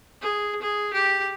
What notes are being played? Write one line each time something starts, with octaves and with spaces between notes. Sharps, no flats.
G#4
G#4
G4